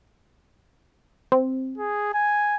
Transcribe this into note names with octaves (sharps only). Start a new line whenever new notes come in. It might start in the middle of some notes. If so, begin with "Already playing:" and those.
C4
G#4
G#5